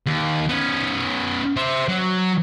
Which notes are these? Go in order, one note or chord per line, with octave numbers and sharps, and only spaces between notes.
D#2
B3 C#4
C5 E5
F#3